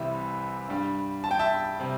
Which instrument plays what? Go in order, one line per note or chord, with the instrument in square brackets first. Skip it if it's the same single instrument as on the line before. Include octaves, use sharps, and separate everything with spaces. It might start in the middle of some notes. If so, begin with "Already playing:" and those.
Already playing: [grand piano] C2 C3 E3 G3 E5
G2 G3
A5
G5
E5 A5
C3 G3